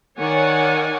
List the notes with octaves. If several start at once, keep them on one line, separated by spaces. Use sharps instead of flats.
D#3 C#5 D5 F#5 G#5